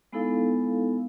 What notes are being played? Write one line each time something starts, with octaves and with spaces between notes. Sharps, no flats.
G#3 B3 D#4 E4 A4 F5